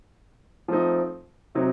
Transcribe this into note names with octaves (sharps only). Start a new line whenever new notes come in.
F3 A3 C4 D#4
C3 F#3 C4 D#4